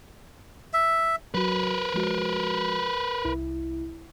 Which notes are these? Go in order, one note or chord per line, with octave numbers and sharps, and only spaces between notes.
E5
F#3 F#4 A#4 B4
F3 G#3 F#4
C2 E4